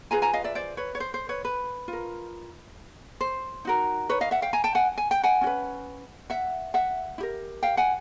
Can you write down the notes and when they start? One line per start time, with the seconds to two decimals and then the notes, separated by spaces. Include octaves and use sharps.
0.11 F4 G#4 B4 G#5 A#5
0.22 G#5 A#5
0.33 D#5 F5
0.44 D5 E5
0.55 C5 D5
0.77 B4 C#5
0.95 C#5
1.00 C5
1.14 C5
1.29 B4 C#5
1.45 B4
1.88 F4
1.93 A#4
3.21 C5
3.65 D#4 F#4 A#4
4.09 B4 C#5
4.21 D#5 F5
4.31 E5 F#5
4.42 F5 G5
4.53 G#5 A#5
4.64 G5 A5
4.75 F#5 G#5
4.98 G#5
5.11 G5
5.23 F#5 G#5
5.41 C#4 F#4
5.47 B4
6.30 E5 F#5
6.74 E5 F#5
7.18 E4 G4 A#4
7.63 F5 G5
7.77 F#5 G#5